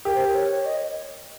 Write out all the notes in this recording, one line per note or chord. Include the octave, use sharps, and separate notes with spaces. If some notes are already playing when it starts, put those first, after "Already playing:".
G4 A#4
C5
A#4
C#5
D#5